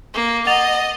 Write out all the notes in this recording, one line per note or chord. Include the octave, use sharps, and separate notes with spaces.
A#3
D#5 F#5 A6 F7